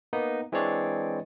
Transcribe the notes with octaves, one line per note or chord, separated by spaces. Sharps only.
A#3 B3 D#4
E3 G#3 C4 D4 C#5 D5